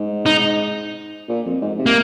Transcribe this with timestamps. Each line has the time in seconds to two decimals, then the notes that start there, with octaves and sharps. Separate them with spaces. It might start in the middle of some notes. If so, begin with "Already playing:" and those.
Already playing: G#2
0.26 D#4
1.29 A#2
1.46 F2
1.61 G#2
1.79 C3
1.86 A#3